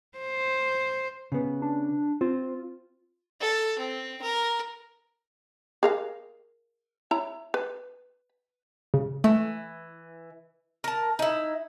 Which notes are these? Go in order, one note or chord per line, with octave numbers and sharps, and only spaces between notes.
C5
C#3 B3
D4
C4 F4
A4
C4
A#4
G#4 A#4 F5
E4 C#5 A#5
B4
C#3
E3 A3
A#4 A5
D#4 E4